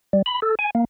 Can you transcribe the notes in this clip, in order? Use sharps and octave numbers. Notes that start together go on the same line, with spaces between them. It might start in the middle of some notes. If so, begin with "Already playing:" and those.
G3
B5
A4
G#5
A#3